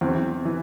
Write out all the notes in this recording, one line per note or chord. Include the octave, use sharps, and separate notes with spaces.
E2 C4
E3